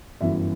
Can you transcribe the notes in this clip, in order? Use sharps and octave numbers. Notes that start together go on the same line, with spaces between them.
G1 F#2 E3 E5